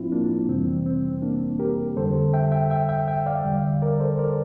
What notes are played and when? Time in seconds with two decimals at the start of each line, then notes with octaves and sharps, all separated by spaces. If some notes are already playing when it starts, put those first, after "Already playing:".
Already playing: A2 F3 C4 D4 E4 F4
0.12 A#3 D4
0.48 F2 C3 E3 G3 C4
0.86 C4
1.22 A#3 D4
1.59 G4 A#4
1.97 F2 D3 G3 A4 C5
2.33 E5 G5
2.52 E5 G5
2.70 E5 G5
2.89 E5 G5
3.08 E5 G5
3.26 D5 F5
3.45 E2 D3 G3
3.82 A#4 D5
4.00 A4 C5
4.19 A#4 D5